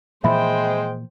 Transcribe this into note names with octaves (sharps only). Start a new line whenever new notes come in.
A#2 E3 F3 G#3 C5 E5 G5 B5